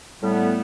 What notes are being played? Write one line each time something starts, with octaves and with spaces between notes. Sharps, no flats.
A2 G3 A3 B3